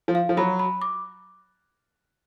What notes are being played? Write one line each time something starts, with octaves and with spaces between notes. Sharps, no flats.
F3
F5
F3
F#3 B5
B5
D6